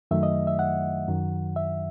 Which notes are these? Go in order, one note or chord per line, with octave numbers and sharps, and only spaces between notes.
F#2 D#3 F#3 A3 E5
D#5
E5
F#5
F#2 D#3 F#3
E5